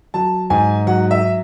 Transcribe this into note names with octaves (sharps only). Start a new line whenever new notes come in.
F#3 A5
G#2 G#5
F#3 F#5
E5